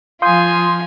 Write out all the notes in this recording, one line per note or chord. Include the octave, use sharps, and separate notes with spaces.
F3 F4 F5 G#5 C6 D#6 G6